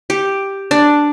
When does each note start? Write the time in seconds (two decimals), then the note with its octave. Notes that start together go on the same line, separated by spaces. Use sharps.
0.10 G4
0.71 D4